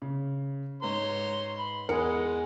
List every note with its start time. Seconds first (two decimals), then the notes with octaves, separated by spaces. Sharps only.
0.02 C#3
0.82 G#2 B4 C#5 A#5 C6
1.58 B5
1.89 E2 G#3 G#4 A#4 F#5 C#7